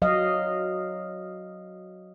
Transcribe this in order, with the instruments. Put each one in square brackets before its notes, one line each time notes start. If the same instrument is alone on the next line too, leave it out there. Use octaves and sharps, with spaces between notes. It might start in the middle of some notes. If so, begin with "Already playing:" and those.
[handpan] F#3 D#5 F5